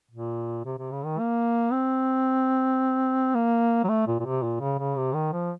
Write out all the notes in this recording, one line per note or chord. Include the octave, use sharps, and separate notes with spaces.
A#2
C3
C3
C#3
D#3
A#3
C4
A#3
F#3
A3
A#2
A#2
C3
A#2
C#3
C#3
C3
D#3
F3